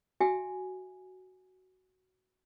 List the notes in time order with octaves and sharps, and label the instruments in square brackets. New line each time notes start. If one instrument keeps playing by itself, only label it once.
[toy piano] F#4 E5 G5 G#5